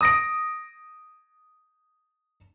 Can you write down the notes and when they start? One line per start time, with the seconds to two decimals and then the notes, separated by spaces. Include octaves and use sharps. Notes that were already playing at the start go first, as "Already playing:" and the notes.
0.01 D#6 A#6 D7